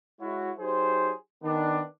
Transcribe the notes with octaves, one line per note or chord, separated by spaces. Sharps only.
G#3 E4 F#4 C#5
F#3 D#4 G4 G#4 C5
D#3 B3 D4